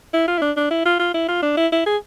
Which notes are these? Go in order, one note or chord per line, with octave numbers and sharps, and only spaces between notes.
E4
F4
E4
D4
D4
E4
F4
F4
E4
F4
D4
E4
E4
G#4